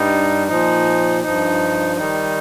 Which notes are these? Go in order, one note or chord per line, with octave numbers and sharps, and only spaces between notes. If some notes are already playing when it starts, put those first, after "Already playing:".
Already playing: G2 G3 D#4
A#2 F3 D#4
G2 F3 D#4
D#3 G3 D#4